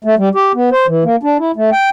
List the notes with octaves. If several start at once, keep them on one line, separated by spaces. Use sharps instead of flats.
A3
G3
G4
B3
C5
E3
A#3
D4
E4
A3
G5